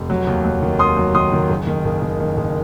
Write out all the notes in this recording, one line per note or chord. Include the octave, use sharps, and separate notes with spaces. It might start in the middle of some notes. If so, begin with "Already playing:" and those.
Already playing: F1
F#3
D#2
F#3
D#3
D#2 C6 D#6
F#3
D#3 C6 D#6
D#3
F#1
D#3
F#1
D#3
D#3
F#1